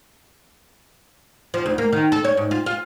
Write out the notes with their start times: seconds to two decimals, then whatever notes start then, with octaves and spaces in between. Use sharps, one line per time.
1.54 F3
1.66 D2
1.78 A#3
1.93 D#3
2.12 A4
2.25 C#5
2.37 G#2
2.51 F4
2.66 F4